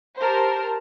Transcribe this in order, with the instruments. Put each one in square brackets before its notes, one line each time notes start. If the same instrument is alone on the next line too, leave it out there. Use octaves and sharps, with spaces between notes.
[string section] G4 A#4 C5 [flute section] A5